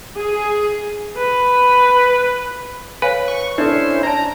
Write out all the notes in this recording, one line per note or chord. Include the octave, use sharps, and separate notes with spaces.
G#4
B4
B4 C#5 F5 G#5
C#6
C#4 D4 E4 A4 C5 E5
D5 A5 A#5